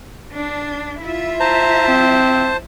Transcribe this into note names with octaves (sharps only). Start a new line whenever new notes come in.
D4
E4 F4 E5
C5 A5 A#5
C4